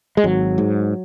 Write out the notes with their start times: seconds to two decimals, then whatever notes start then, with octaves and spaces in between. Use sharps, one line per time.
0.17 G#3
0.24 G#1 F#3
0.58 G#2